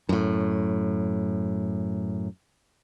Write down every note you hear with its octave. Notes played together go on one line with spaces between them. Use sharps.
F#2 A2